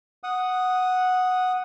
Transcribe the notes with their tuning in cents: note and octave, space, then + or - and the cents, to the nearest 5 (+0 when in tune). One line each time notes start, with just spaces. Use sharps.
F#5 -5 D#6 +0